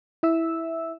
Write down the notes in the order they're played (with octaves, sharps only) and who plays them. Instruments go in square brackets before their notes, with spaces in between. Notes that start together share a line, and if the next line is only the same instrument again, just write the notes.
[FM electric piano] E4 E5 E6